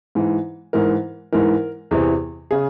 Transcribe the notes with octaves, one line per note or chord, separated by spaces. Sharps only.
G#2 E3
G#2 E3 A#4
G#2 E3 A#4
E2 C3 E3
C#3 G#4